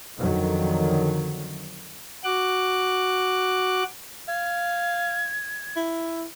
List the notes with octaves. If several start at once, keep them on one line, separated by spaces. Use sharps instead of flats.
F2 D3 D#3 F#3
F#4 D6 F#6
F5 G#6
E4